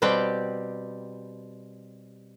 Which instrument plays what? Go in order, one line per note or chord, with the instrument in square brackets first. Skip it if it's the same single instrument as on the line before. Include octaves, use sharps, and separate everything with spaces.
[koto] B2 G3 C4 G4 B4 G5